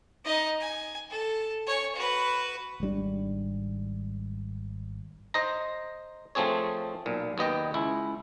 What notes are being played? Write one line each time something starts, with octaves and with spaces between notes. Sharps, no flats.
D#4 D#5
G#5
A4
C#5 G#5
F#4 B4
G#1 G#2 G3 D4
C5 D#5 A#5
F3 A3 C4 G#4 C#5
B1 A#2
D#2 B3 D#5 G5
C#2 E4